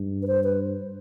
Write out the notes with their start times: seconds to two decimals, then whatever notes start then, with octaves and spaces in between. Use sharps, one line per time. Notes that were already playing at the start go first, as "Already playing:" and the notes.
Already playing: G2
0.22 B4
0.27 C5
0.44 B4